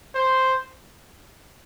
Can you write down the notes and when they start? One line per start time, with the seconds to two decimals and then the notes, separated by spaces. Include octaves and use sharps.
0.15 C5